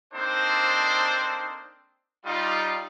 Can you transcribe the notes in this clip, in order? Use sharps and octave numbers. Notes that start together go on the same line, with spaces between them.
A#3 C4 D4 D#4 A4 C5
G3 D#4 F4